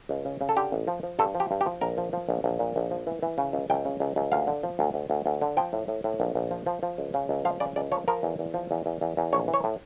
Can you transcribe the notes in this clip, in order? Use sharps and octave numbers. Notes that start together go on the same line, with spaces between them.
C#2
C#3
C#3
A4
D3 G4
A1
F3
F3
G2 A4
F3
G4
G2
G4
F3
A#1 A#4
F3
F3
A#1
A#1
A#2
A#1
F3
E3
E3
C#3
C#2
C#2 G5
C#3
C#2
C#2
D2 F5
D3
F3
D2
D2
D2
D2
D3
F3 G5
A2
A2
A2
A#1
A#1
F3
F3
F3
C#2
C#3
C#2
F3 F5
C#3 D5
C#2 D5
F3 C#5
F3 A#4
E2
E2
F3
E2
E2
E2
E2
A#1 C#5
E3
C#5
A2